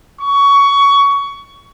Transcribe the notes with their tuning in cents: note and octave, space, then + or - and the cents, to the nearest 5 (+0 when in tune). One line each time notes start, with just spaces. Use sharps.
C#6 +20